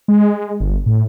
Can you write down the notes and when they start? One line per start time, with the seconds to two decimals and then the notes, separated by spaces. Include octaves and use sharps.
0.08 G#3
0.60 G1
0.86 A2